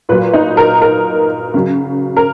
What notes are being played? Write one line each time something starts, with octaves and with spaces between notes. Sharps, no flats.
A#2 F#3 B4
D#4
A#4
A#4
C#3 F#3
A#4